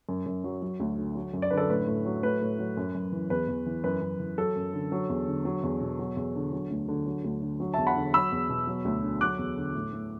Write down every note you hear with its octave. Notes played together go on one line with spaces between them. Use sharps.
F#2
F#2
F#3
F#3
D2
D3
F#3
F#2
D5
D3 B4
A4 D5
A2 B4
A2
F#3
A2 B4
A2
F#3
F#2
F#2
E3
E2 B4
E2
E3
F#2 B4
F#2
E3
F#3 A4
F#2
D3
F#3
E2
D3
F#3
E2
B2
F#3
E2
D3
F#3
D2
D3
F#3
D2
D3
F#3
E2 E5 A5
F#5 B5
D3
F#3 B5 E6
E2
B2
F#3
D2
D3
F#3 D6 F#6
E2
D3
A2
A2